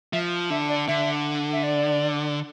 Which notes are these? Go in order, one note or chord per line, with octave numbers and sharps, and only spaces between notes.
F3 E5
D3 E5
D5
D3 E5
E5
D5